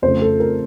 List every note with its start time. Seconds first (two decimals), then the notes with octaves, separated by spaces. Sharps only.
0.02 F2 C#3 A3 C5
0.22 A4
0.40 A#4